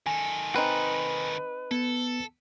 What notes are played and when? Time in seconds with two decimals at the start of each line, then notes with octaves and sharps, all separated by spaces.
0.07 D#3 A4 G#5
0.56 C4 D#4 B4
1.71 B3 A4